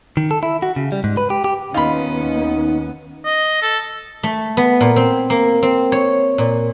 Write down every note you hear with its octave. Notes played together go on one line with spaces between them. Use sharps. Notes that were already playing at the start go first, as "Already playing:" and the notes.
D#3
A4
E4
F#4
C#3
G3
G#2
B4
G4
G4
D#2 B3 C#4 D#4 F4 B5
D#5
A4
A3
B3
A#2
C4
A#3
C4
C#5
A#2